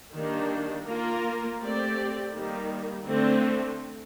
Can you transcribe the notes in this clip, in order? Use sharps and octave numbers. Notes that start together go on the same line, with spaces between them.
D#3 G3 A#3 D4
A#3 F4 A#4
A3 C4 G4 D5
D#3 G3 A#3
D3 A3 C4